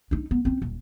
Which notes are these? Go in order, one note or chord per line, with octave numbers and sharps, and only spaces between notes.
D4 D#4
B3
C4 C#4
D#1